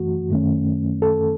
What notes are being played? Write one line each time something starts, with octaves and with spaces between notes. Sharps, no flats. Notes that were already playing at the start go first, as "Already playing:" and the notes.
Already playing: F#2 E3 A3 F#4
F#2 D#3 A3 C#4
A4